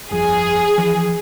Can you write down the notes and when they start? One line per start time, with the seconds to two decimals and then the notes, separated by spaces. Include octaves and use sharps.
0.11 G1 F2 G#4
0.78 E3 F3